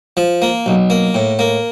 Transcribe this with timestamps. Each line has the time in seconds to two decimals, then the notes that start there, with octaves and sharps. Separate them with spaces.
0.17 F3
0.42 A#3
0.66 B1
0.90 A#3
1.14 A2
1.39 A#3